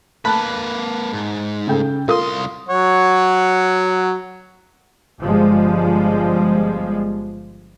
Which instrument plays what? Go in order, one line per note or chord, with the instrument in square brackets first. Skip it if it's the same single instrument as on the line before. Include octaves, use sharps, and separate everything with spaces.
[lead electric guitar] A#3 B4 [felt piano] A5 B5 F#6
[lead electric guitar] G#2
[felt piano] C#3 A4 G5
[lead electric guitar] C2 C6 [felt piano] F4 A#4 D#6
[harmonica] F#3 C#5 F#5
[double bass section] G1 F3 G3 G#3